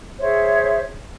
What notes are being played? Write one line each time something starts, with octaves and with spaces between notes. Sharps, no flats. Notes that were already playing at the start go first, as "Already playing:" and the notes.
G#4 C5 C#5 E5